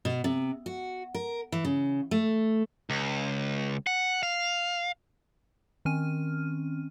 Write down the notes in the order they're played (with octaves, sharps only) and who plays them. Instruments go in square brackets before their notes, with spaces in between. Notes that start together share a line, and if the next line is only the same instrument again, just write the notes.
[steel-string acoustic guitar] B2
C3
F#4
A#4
E3
C#3
A3
[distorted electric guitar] C#2
F#5
F5
[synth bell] D#3 C4 C#4 F6 D#7